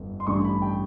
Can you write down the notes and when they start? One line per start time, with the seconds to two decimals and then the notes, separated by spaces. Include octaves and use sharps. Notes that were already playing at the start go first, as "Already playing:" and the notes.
Already playing: G1 F2
0.20 C6
0.27 A1 G2 D3 C#6
0.44 B5
0.62 G5